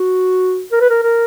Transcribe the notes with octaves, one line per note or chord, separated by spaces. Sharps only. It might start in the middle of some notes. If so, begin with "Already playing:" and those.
Already playing: F#4
A#4
B4
A#4
A#4